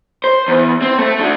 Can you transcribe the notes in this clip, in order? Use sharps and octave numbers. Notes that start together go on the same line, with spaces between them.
C5
E2
C4
A3 A4
A3 D4